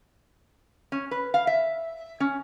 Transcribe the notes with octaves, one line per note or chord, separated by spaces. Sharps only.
C#4
B4
F5
E5
C#4